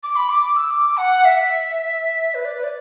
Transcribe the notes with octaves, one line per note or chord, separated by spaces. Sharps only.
D6
B5
D6
D6
E6
D6
F#5
E5
B4
D5
B4
D5